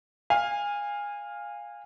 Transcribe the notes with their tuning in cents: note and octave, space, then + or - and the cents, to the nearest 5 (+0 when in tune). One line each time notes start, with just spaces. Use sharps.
F5 +5 G#5 -20